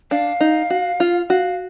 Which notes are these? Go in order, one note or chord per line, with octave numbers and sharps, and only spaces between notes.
D4 F5
D#4
F#4
F4
F#4 F5